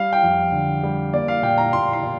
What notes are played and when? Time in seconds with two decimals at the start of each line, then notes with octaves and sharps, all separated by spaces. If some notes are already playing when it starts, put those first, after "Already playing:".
Already playing: G3 F5
0.13 G5
0.23 F2
0.52 D3
0.83 G3
1.13 A#3 D5
1.28 F5
1.43 A#2 G5
1.58 A#5
1.73 A#2 C6
1.93 C6
2.03 A#2